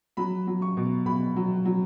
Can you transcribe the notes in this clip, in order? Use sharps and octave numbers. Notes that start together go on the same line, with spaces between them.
F#3 B5
F#3
C#6
B2
B2 B5
F#3
F#3